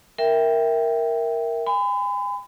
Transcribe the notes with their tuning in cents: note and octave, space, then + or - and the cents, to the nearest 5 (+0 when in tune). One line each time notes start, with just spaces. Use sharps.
A#4 +0 E5 +0 G5 +5
G#5 -35 B5 +40